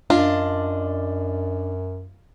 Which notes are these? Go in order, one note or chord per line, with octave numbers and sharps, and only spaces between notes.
F#2 D4 F4 D5 D#5